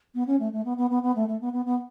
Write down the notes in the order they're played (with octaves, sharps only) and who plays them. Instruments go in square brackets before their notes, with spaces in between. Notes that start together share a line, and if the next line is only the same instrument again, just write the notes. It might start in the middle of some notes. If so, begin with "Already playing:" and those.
[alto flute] B3
C#4
A3
A3
B3
B3
B3
B3
A3
A3
B3
B3
B3